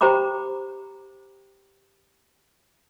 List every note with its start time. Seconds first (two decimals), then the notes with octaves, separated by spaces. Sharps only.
0.01 G4 C5 G5 A#5 B5 D6